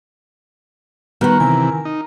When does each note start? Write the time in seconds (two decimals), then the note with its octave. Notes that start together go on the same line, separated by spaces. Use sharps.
1.21 D#3 G3 B3 F#4 A#4 B4 A#5
1.40 C3 E3 G#5
1.85 D#4